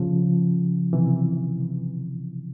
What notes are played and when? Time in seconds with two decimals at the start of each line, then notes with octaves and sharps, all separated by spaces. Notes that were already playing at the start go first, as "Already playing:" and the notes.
Already playing: C#3 F3
0.93 C3 E3